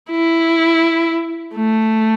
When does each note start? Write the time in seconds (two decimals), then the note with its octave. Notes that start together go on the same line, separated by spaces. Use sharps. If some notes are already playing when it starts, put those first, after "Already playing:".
0.11 E4
1.55 A3